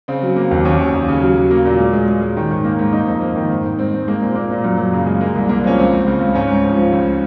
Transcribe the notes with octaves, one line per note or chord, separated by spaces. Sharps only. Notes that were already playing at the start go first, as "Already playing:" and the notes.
C#3 C4
F#3
A#3
D#2
D#2 C#4
D#2
D#2
C#3
F#3
F#3
A#3
A#2
G#3
G#3
G#3
G#3
D#3
G#2
A#3
G#2
A#3 D#4
F2
A#3
D#3
G#2
G#2
G#2 C4
G#2
G#3 A#3
A#2
A#2 A#3
A#2
F#2
F#2
C#3
G#3
G#3 A#3
C2
C2 A#3
F3 C#4
C#2 C4
C#2
C#3
C#2
G#2 C#4
G#2
F3
F3
C#2